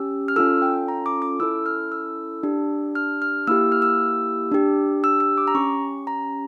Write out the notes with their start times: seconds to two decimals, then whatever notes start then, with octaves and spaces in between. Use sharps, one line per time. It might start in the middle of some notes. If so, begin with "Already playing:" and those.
Already playing: C#4 G4 E6
0.28 F6
0.36 C#4 F4 A4 E6
0.62 G5
0.88 A#5
1.06 D6
1.22 D6
1.40 C#4 E4 A4 E6
1.66 F6
1.92 E6
2.43 D4 G4
2.95 F6
3.22 F6
3.47 A#3 E4 G4 E6
3.72 F6
3.82 E6
4.52 D4 G4
5.04 E6
5.20 E6
5.38 D6
5.48 A#5
5.54 C#4 G4 C#6
6.07 A#5